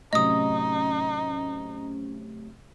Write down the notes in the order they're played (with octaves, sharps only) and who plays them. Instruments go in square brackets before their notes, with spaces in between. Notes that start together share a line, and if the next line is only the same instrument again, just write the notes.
[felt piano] A2 C3 F#3 [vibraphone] C#4 [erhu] D#4 [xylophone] D#5 D#6